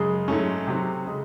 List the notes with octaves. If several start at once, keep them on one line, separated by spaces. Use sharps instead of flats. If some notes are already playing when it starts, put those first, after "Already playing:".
Already playing: F#2 C#3 G#3 G#4
G#2 F#3 A3 C#4
C3 F#3 C4
C#3 G#3